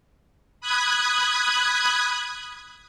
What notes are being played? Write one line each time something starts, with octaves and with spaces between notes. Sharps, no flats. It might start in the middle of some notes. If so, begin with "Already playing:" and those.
B5 D#6 F#6 G#6